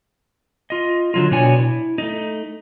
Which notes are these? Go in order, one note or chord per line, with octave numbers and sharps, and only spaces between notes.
F4 D#5
D3 F#3 F4
B2 D4 F#4 C#5 G#5
E4
A3 D#4